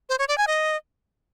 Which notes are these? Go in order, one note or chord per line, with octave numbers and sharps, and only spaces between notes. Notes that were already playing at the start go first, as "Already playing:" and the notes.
C5
C#5
D5
G#5
D#5